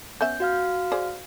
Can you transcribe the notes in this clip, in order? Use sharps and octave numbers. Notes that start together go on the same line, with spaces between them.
B3 C#4 E5 G6
F#4 F5 F6
G#4 C5 D5